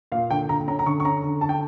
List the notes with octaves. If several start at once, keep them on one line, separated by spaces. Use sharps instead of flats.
A#2 F5
D3 G5
D3 A#5
C#4 A#5
A#5
D3 C#6
C#6
C#4 A#5
D3
D3 A5
G5